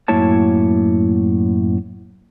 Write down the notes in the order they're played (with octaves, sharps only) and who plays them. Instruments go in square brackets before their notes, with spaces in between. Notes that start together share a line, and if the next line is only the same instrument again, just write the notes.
[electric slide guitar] F#2 A2 A#3 E4 C#5 A5